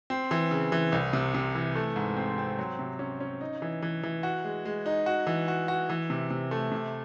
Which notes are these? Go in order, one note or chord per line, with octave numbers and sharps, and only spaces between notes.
C4
E3
C#3
E3
C2
C3
C3
E3
A3
G#2
C4
C4
F#3
C3
C#4
C#4
D#4
E3
E3
E3
F#4
G#3
G#3
D#4
F#4
E3
F#4
F#4
E3
C3
C3
A3
C3